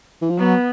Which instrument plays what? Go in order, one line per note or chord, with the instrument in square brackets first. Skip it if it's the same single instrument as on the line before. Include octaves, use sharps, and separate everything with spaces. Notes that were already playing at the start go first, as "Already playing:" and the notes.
[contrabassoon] E3
F3
[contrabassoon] F#3 [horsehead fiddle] B3